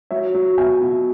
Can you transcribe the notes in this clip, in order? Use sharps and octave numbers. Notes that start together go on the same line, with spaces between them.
F#3 C#5 E5
F#3
B2 E5 G#5
B2